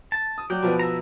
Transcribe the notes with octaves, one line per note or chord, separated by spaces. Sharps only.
A5
D#6
F#3 D5 G5
B2 F3 B3
E5 A#5